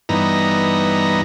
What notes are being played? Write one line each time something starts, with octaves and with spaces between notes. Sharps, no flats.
G2 E3 B3 D#4 A#5